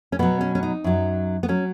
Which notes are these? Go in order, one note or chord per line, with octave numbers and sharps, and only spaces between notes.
C#4
B2 F#3 B3
C#4
C#4
D#4
F#2 F#3
B3
F#3 C#4